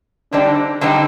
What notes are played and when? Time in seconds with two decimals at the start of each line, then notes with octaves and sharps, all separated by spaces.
0.33 D3 G3 C4 D4 D#4
0.81 D3 G3 C4 D#4